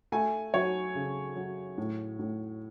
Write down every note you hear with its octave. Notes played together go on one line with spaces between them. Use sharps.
A3 G#5
F#3 C#5
C#3
F#3
A2
A2